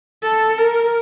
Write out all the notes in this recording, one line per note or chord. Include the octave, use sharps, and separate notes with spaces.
A4
A#4